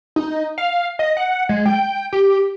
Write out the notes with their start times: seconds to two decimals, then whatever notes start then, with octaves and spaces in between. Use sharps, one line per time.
0.16 D#4
0.58 F5
0.99 D#5
1.17 F#5
1.49 G#3
1.65 G5
2.13 G4